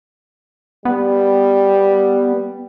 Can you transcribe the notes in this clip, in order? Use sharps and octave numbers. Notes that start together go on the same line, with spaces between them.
G3 B3